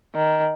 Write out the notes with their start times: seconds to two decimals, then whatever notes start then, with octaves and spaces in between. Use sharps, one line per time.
0.15 D#3